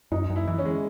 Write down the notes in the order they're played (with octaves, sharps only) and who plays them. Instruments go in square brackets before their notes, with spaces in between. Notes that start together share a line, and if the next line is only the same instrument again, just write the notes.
[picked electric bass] F#2 [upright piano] D#4
[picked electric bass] F#2
[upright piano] E4
[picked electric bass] E3
[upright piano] C#4
[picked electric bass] G#3